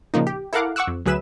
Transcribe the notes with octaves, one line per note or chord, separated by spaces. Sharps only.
A#2 C#3 F3 A#3 D#4
G4
E4 A4 A#4 F5 F#5 D6
F#5 C#6 D6 E6 F#6
F2
D2 F#3 G#4 B4 E5 E7